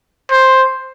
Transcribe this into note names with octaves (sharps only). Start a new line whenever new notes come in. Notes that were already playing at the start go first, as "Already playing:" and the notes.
C5